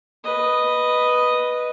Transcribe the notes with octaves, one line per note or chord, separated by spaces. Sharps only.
B4 D#5